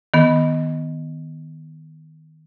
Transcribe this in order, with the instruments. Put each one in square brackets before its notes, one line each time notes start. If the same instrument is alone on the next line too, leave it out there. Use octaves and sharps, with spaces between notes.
[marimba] D#3 B3